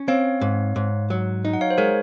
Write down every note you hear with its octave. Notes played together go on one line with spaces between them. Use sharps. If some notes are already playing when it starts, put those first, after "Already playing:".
Already playing: C#4
C4 C#5 F5
G#2
G#2
F#3
D#4
F#5
C#5 F5
C5
G#3 A#4 C#5